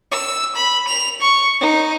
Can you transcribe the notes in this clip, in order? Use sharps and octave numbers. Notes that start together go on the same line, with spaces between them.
E6
B5
F7
C#6
D#4